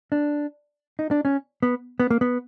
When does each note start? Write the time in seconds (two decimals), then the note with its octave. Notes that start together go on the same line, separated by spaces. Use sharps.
0.12 D4
0.99 D#4
1.11 D4
1.25 C#4
1.63 B3
2.00 B3
2.10 A#3
2.21 B3